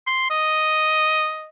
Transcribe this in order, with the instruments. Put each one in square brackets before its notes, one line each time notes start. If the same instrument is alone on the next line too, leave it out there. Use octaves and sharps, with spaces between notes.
[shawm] C6
D#5